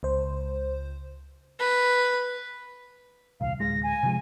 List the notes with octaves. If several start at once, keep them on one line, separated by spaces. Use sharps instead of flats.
C#2 C5
B4
D#1 C2 F5
D1 G#3 A#6
G#5
C3 F3 G#3